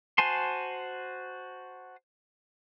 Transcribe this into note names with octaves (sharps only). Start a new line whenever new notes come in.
F#4 C5 G#5 A5 C6